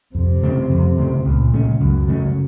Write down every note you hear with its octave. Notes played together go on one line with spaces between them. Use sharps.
F2 C3
C#3 A3 C4
F2
C#3 A3 C4
C#2 A#2
C#3 A3 C#4
C#2 F#2
C#3 A3 C#4